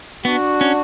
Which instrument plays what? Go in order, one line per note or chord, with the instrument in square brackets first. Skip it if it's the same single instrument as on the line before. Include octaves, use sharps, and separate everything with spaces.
[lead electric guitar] B3 [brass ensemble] D4 F#4
[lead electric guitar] C#4